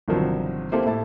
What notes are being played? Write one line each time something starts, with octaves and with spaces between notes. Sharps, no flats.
G1 C3 D#3 F3 F#3
A#3 C4 E4 G4 A4 C5
A2 E4 A5